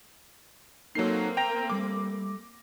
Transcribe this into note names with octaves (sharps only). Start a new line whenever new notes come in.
F#3 A#3 C4 D#4 A4 C7
G5 A#5 A#6
G3 A3 D6